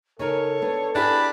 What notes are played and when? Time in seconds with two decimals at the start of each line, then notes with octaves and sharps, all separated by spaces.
0.19 C#3 D#4 A4 A#4 C#5
0.62 B3 D4
0.95 D4 E4 G4 G#4 B5